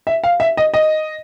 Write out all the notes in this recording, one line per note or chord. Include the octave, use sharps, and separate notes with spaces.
E5
F5
E5
D#5
D#5